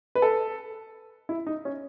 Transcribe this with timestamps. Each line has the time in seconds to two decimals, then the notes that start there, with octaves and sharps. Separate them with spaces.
0.15 B4
0.22 A4
1.29 E4
1.46 D#4
1.65 C#4